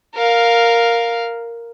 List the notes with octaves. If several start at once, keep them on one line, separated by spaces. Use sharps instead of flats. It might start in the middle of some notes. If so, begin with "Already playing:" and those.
A#4 F5